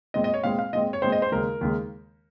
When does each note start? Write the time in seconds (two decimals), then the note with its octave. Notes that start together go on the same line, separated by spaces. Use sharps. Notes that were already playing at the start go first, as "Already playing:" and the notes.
0.14 A#2 G#3 C4 D#5
0.24 D#5
0.34 C#5
0.44 A#2 G#3 C4 F5
0.59 F5
0.73 A#2 G#3 C4 D#5
0.93 C#5
1.02 A#2 G#3 C4 C5
1.12 D#5
1.22 C5
1.32 D#2 C#3 G#3 A#4
1.61 D#2 C#3 G#3